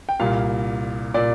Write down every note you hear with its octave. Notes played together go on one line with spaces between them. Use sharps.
G5
C2 A#2 F5
A#2 D5